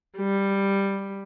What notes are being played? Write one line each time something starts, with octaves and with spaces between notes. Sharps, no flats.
G3